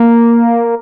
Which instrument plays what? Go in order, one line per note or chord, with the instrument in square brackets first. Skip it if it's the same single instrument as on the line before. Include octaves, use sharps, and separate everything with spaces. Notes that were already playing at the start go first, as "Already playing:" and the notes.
Already playing: [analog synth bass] A#3